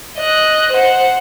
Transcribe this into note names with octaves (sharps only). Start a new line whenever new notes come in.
D#5 F#6
C5 F#5